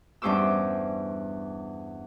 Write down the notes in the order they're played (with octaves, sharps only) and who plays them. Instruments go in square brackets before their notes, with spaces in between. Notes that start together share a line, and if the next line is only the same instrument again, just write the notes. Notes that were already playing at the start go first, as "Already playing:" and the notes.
[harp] E2 G2 C#4 C5 D6 E6